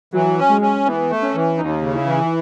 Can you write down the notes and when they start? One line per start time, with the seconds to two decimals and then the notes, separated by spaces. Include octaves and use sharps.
0.13 E3 F#3
0.38 C#4
0.49 G#3
0.61 C#4
0.85 E3 B3
1.10 A3
1.22 C#4
1.34 E3
1.58 D#2 D#4
1.82 C#3
1.94 E4
2.06 E3